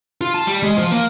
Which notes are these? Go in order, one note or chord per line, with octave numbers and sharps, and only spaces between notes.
F4
A5
G3
G#3
F3
A#3